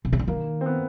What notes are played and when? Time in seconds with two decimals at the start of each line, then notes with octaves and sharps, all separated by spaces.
0.05 C3
0.13 C#3
0.19 D3
0.28 D#3 A#3
0.61 C4
0.66 B3